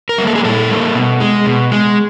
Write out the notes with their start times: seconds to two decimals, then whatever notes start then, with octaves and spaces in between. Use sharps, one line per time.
0.09 A#4
0.18 G3 A#3
0.27 A4
0.35 G#4
0.44 A#2 A4
0.70 G3 A#3
0.95 B2
1.20 G#3
1.46 B2
1.72 G#3